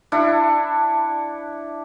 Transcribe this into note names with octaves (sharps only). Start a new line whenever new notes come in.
D4 E4 F#5